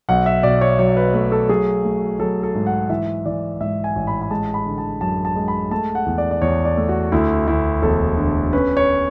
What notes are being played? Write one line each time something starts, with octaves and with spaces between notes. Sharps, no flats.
B1 F#5
E5
B2 D5
C#5
F#3 C#5
B4
A3 B4
A4
F#3 G#4
A3
F#3 A4
A4
G#2
F#5
E3 E5
E3 D5
G#2 E5
G#5
A1
B5
B5
G#3 A5
B5
D3
A5
F#2 A5
A5
G#3
B5
A3 A5
F#5
E2
D5
D5
E2 C#5
D5
A3
F#4
D2 E4
D2 E4
E1 A4
D3
C#4 B4
C#5